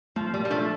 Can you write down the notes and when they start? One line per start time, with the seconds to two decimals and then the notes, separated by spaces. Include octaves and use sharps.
0.16 F3 A3
0.33 A#2 G3
0.45 G3
0.50 F3 A3 D4